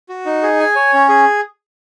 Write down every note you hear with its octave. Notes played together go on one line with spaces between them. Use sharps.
F#4
D#4
G#4
G#5
C#5
C#4
G#4